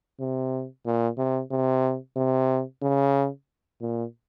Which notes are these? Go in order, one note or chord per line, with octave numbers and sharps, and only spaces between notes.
C3
A#2
C3
C3
C3
C#3
A#2